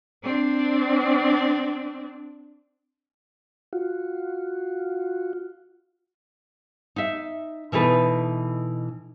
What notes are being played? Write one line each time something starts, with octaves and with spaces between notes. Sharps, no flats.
C4 D4
F4 F#4
D#4 E5
B2 E3 D#4 A4 B4